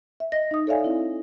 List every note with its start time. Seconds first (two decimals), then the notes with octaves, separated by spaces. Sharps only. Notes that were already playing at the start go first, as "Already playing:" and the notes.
0.20 E5
0.32 D#5 A#6
0.51 D#4 D#6
0.67 A4 C#5 D5 E5 F5 G#5
0.84 C4 E4